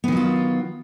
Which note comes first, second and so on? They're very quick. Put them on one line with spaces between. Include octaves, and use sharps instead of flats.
B3 D#3 F#3 F4